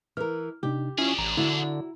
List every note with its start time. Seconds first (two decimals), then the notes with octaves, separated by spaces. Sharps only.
0.17 E3 A#4 F6
0.63 C3 D4 D#4 G4
0.98 C#4 D4 E4 F4 G#4
1.18 A1 A#5
1.37 D3 E4 F#4